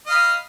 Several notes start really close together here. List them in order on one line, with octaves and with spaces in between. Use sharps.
D#5 F5 B5